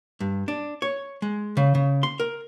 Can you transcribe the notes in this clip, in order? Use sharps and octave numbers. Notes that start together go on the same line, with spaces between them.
G2
D4
C#5
G#3
C#3
C#3
C6
A#4